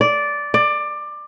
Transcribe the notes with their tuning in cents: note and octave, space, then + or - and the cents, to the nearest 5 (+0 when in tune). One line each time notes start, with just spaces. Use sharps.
D5 -10
D5 +20